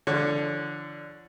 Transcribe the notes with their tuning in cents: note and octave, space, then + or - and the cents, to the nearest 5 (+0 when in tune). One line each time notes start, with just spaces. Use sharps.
D3 +0 F3 -40 C#5 +0